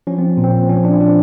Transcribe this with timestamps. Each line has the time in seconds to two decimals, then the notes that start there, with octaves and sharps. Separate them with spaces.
0.07 F3 C#4
0.19 C4
0.37 A#2
0.44 C4
0.69 F3 C#4
0.85 D4
1.00 F3 D4